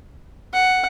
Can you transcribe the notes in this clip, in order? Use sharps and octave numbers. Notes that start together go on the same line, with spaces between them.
F#5